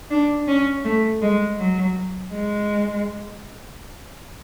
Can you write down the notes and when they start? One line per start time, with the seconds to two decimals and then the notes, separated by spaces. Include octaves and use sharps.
0.11 D4
0.48 C#4
0.84 A3
1.22 G#3
1.59 F#3
2.33 G#3